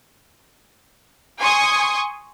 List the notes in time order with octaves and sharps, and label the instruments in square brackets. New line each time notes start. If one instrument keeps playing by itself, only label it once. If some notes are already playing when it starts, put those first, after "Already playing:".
[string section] G#5 C6 C#6 D#6